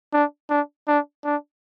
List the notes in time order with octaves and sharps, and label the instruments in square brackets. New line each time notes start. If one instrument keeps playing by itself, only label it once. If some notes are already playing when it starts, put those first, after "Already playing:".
[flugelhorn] D4
D4
D4
D4